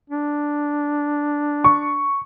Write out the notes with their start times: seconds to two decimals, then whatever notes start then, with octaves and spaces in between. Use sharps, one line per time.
0.10 D4
1.64 C#6